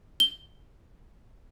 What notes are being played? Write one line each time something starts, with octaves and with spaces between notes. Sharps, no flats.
G7